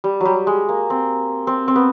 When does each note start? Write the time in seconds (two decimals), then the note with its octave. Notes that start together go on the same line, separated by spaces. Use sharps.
0.04 G3
0.21 F#3 G3
0.47 G#3
0.69 A#3
0.90 C4
1.47 C4
1.68 C4
1.76 B3